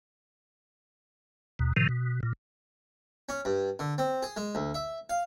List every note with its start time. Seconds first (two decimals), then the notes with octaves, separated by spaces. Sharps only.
1.59 D#2 B2
1.76 A2 C3 D#3 F3
1.89 B2
2.23 A#2
3.29 C#4
3.45 G2
3.79 D3
3.98 C4
4.23 G#4
4.37 G#3
4.55 D2
4.74 E5
5.10 F5